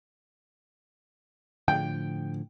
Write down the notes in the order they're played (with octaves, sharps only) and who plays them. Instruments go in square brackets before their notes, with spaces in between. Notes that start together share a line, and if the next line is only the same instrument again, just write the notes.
[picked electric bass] A2 D3 F3 [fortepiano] G5